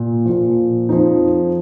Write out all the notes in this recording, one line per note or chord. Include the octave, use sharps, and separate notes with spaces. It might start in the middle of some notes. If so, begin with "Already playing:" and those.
Already playing: A#2
A#2 F3
F2 F3 D#4